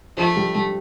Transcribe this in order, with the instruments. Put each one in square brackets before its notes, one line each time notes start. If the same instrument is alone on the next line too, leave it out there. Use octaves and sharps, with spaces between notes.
[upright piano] F3 [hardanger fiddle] A3
[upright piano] G3
G3